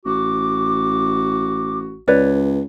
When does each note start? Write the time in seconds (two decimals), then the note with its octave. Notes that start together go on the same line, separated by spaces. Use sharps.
0.05 A1 F#4 D6
2.08 C#2 B4 C#5 D5